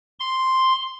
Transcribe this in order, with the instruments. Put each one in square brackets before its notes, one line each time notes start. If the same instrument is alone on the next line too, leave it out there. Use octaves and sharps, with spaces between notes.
[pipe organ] C6